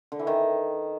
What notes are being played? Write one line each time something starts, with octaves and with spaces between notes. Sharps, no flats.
D3
E3
D#3